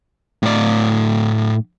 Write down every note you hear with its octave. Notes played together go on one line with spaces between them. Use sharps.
A2 D5